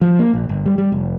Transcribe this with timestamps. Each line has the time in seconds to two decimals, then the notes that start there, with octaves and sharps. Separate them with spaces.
0.01 F3
0.19 A#3
0.34 A#1
0.49 G1
0.66 G3
0.78 G3
0.92 F1